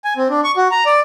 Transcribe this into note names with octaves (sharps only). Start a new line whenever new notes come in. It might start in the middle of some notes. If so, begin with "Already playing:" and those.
G#5
C4
D4
C#6
F#4
A#5
D5